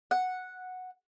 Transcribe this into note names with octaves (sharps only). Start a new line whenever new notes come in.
F#5